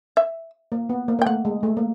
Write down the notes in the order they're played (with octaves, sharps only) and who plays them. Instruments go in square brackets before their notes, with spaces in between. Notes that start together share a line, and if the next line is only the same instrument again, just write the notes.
[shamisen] E5
[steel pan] A#3
B3
A#3
A#3
[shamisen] G5
[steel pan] A3 [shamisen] F#5
[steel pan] G#3
A3
A#3